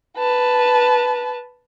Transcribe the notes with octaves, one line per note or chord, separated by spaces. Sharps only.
B4 A5